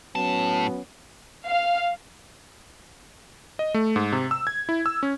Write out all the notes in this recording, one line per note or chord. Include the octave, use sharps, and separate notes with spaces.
A2 F#3 B3 C#4 A5
F5
D#5
A3
G#2
C3
E6
G#6
E4
E6
C#4